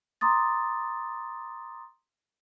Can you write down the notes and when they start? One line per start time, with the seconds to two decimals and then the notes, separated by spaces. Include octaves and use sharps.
0.21 A#5 C6 D6 D#6 A6